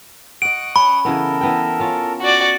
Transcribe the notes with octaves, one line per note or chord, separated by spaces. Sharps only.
D#5 F#5 C#6 D#6 F#6 D7
C#4 B5
C#3 E3 B3 A4 A#4
E3 B3 G5
C#4 F4
F#4 D5